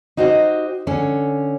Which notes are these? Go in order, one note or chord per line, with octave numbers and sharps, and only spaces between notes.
D#4 F#4 G4 C5 D#5
D3 C#4